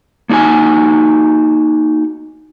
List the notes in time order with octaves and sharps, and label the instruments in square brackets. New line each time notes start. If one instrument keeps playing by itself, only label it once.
[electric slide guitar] A#3 D4 D#4 F#4 G#5